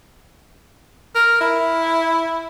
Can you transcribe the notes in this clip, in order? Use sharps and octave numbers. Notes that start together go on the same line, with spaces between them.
A#4
E4